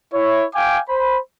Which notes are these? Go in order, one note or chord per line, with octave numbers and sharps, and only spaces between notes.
E4 C#5
F5 G5 G#5 D6
C5 B5